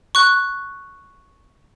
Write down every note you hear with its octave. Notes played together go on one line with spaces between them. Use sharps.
C#6 F#6